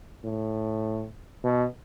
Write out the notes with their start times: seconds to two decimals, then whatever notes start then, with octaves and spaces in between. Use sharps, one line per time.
0.25 A2
1.44 B2